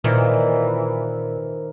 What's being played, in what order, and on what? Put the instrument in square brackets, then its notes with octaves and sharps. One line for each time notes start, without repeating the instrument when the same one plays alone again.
[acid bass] A#2 [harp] D#3 [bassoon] E3 [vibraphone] A#4 C5